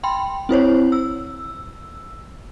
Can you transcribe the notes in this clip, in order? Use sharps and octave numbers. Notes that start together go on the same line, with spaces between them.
G5 B5 C6
C4 E4 C5 C#5
E6